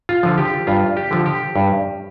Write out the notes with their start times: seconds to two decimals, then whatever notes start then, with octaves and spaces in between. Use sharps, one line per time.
0.09 F4
0.23 D3 F3
0.38 G4
0.67 G2 F4
0.97 G4
1.11 D3 F3
1.26 G4
1.56 G2